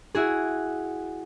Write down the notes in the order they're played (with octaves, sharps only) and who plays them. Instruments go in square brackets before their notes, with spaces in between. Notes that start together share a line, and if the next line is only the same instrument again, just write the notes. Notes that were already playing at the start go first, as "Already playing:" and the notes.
[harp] E4 F#4 G#4